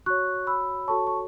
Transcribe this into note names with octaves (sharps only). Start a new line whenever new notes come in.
F#4 C#5 C#6 F#6
B5 E6
F#4 A4 C#5 A5 C#6
C#6